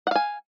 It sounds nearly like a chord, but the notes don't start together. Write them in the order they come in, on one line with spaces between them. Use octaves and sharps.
F#5 F5 G#5